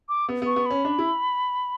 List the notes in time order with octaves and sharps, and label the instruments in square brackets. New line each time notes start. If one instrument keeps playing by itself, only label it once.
[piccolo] D6
[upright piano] B3
[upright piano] B3 [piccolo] C#6
[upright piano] B3
[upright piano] C#4 [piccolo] B5
[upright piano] D4
E4